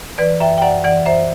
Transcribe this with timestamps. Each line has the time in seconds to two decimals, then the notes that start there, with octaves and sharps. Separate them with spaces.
0.18 E3 B4 D5
0.40 F#2 E5 G5
0.58 G5
0.62 F#2 D5 F#5
0.84 E3 D5 F#5
1.06 F#2 C5 E5